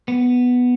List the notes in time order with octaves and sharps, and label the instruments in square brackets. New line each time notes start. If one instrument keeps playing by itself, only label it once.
[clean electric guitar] B3